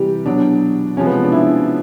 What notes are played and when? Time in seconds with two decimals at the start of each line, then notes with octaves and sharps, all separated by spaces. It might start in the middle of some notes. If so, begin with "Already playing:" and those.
Already playing: C3 E3 G3 G4
0.26 B2 F#3 D4
0.97 C3 F3 G#3 C#4
1.06 B3
1.24 D4
1.32 E4